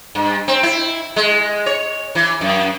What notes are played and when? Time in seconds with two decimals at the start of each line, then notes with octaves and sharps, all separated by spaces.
0.15 G2
0.48 C4
0.63 E4
1.16 G#3
1.66 C#5
2.15 E3
2.41 F#2